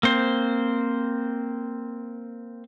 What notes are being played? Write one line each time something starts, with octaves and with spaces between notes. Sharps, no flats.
A#3 C4 C5